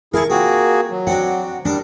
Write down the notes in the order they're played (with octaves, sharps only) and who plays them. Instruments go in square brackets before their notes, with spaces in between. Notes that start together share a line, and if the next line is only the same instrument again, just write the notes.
[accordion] E4 G#4 [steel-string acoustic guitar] A#4 [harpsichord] F5 A5 C#6
[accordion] A#3 F#4 G#4 [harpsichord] C4 F4
[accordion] F#3
[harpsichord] C4 D4 F#4 [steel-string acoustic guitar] F#5
[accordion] G3 [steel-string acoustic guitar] D4 [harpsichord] D#4 A#4